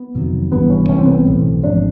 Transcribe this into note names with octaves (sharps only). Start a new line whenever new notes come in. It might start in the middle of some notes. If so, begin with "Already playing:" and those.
Already playing: B3
F2 C3 D#3 F#3
G#1 G2 E3 B3
C#4
C2 C3 E3 A3 C#4
C4
B3
C4
B1 A2 E3 A3
G#1 G#2 F3 D4